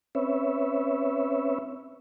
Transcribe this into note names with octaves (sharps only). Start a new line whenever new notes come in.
C4 C#4 B4 C#5 E5